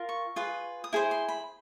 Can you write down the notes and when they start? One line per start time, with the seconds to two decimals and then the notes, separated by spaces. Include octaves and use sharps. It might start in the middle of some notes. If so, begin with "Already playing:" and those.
Already playing: F4 A#4
0.09 C#6
0.36 F4 G#4 B4
0.84 D#6
0.93 E4 G#4 C5
1.11 C6
1.28 B5